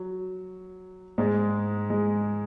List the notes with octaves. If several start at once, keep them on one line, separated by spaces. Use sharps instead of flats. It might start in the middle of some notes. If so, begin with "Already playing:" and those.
Already playing: F#3
G#2 G#3
G#3